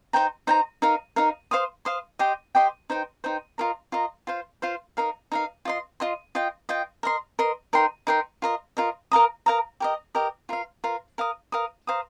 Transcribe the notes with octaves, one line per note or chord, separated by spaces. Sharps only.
D#4 C5 G5 A#5
D#4 C5 G5 A#5
D#4 A#4 F5
D#4 A#4 F5
C5 F5 C6 D#6
C5 F5 C6 D#6
G4 D#5 G5 C6
G4 D#5 G5 C6
D#4 C5 G5
D#4 C5 G5
F4 A#4 D#5 A#5
F4 A#4 D#5 A#5
F4 C5 F5
F4 C5 F5
D#4 A#4 F5
D#4 A#4 F5
F4 D#5 C6
F4 D#5 C6
F4 D#5 G5
F4 D#5 G5
A#4 D#5 C6
A#4 D#5 C6
D#4 A#4 G5 C6
D#4 A#4 G5 C6
F4 A#4 D#5
F4 A#4 D#5
A#4 F5 A#5 D#6
A#4 F5 A#5 D#6
G4 A#4 D#5
G4 A#4 D#5
F4 A#4 F5
F4 A#4 F5
A#4 F5 D#6
A#4 F5 D#6
C5 F5 A#5 D#6